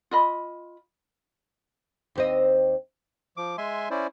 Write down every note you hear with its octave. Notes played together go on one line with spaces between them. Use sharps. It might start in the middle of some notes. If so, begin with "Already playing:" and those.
F4 D#5 B5
D#2 C4 D#5
F3 D6
G#3 E5 G#5 C6
C#4 E4 C5 D5